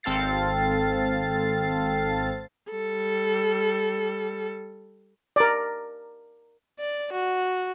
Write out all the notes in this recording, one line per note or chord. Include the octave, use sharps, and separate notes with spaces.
G#1 C4 A4 F5 A6 C7
G3 A4
A#4 D5
D5
F#4